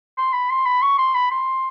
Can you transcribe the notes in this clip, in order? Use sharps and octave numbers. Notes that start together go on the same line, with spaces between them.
C6
B5
C6
B5
C#6
C6
B5
C6